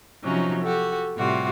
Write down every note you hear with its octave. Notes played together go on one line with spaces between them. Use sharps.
C3 F3 F#3 C#4 D#4
F#4 G4 A4
A2 C3 G3 F4 F#4